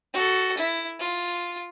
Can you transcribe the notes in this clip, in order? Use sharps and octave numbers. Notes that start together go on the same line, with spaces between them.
F#4 A4
E4
F4